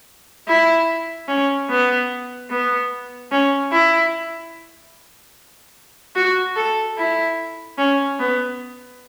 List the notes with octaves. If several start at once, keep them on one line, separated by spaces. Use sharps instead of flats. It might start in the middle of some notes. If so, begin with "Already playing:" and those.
E4
C#4
B3
B3
C#4
E4
F#4
A4
E4
C#4
B3